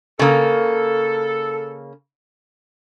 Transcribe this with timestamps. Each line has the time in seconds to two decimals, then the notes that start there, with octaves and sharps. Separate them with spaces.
0.19 C#3 A#3 A4